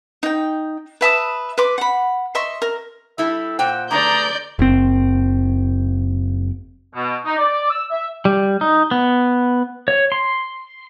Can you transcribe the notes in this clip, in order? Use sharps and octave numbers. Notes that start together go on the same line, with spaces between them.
D#4 G5
B4 E5 A5 D#6
B4 C6 D6
F#5 B5
D#5 E5 C6 C#6
A#4
G3 E4 A4 E5
A#2 C5 F#5 G5
D3 A3 G#4 B4 D5 A#5 G6
F#1 C4
B2
D#4
D5
E6
E5
G3
D#4
B3
C#5
C6